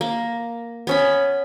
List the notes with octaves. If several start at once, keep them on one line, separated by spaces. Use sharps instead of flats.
A#3
B3 C#4 B5